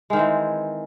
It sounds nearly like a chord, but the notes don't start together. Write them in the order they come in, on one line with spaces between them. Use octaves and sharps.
G#3 D#3 C4 E3